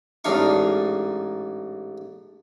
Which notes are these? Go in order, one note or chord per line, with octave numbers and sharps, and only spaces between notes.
A1 G#2 D4 D#4 F5 C#6